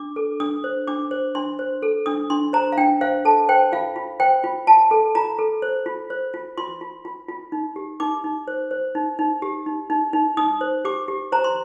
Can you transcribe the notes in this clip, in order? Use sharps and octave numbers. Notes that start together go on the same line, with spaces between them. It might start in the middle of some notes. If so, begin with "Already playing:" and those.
Already playing: D4 D6
A4
D4 D#6
C5
D4 D6
C5
D4 C6
C5
A4
D4 D#6
D4 C6
C5 A#5
F5
D4 G5
C5 F5
A4 A5
C5 G5
F4 F5
F4
C5 G5
F4
F4 A5
A4
F4 A#5
A4
C5
F4
C5
F4
F4 C6
F4
F4
F4
D#4
G4
D#4 D6
D#4
C5
C5
D#4
D#4
G4
D#4
D#4
D#4
D#4 D#6
C5
G4 D6
G4
C5 A#5
C6